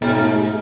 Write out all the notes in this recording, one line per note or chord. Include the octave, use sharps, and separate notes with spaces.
G#2 B2
A3
G#4